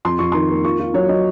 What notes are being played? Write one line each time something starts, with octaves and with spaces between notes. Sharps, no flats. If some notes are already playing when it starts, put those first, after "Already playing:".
F2 C6
F2 C#6
D#3 C6
A#3
F4 C#6
F4
F#3 C#5
F#3 D#5